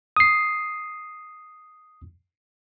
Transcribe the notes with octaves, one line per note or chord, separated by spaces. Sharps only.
D#6 C7